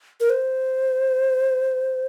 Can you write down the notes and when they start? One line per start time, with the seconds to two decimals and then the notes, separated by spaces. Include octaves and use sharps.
0.20 A#4
0.30 C5